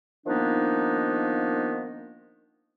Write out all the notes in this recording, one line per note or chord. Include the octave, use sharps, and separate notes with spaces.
D#3 F3 A#3 B3 D4 D#4